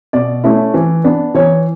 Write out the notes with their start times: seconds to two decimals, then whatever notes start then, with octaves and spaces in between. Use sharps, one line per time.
0.13 B2 D5
0.44 A3 C#4 E4
0.74 E3
1.04 B3 D4
1.34 E3 C#5